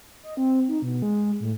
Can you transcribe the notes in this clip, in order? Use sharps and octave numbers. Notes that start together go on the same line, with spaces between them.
D#5
C4
D#4
B2
G#3
A2